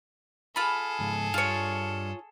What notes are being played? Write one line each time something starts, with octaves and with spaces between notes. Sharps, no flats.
F4 G#4 A4 B5
C#2 G#2
G2 F4 C#5